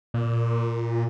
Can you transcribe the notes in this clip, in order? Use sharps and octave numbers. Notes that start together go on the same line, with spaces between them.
A#2